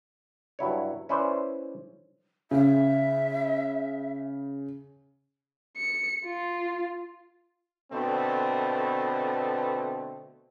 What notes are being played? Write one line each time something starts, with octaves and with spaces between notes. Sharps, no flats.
G2 F#3 E4 C#5
C#4 E4 B4 C5 D5
C#3 E5
C#7
F4
B2 D3 A3 B3 C4